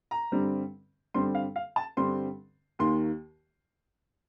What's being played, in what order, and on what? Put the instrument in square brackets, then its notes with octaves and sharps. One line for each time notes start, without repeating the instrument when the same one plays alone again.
[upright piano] A#5
G2 D3 G3 C4
G2 D3 G3 C4 C6
F5
F5
A5
G2 D3 G3 C4 C6
D#2 D#3 A#3 C6